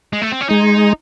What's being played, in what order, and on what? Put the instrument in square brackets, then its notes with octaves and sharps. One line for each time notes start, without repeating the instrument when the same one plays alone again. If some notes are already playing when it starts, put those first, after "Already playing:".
[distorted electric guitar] G#3
A3
C4
C#4
[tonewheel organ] G#3 [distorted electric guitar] D#4